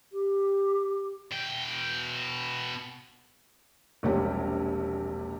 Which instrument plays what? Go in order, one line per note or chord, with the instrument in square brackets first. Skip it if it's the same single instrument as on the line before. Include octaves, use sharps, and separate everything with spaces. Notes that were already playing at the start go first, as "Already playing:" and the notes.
[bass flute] G4
[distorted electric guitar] B2 G5
[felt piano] E1 A#1 C3 G3 C#4 G4